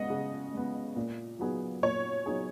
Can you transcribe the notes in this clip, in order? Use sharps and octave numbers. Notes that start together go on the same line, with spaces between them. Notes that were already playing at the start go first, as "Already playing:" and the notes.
Already playing: C#3 G#3 B3 D#5 F#5
C#3
G#3 B3
A#2
F#3 B3 D#4 G#4
A#2 C#5
F#3 B3 D#4 G#4